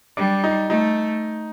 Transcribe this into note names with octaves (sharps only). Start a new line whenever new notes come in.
G3 D4
D#4
A3 D#4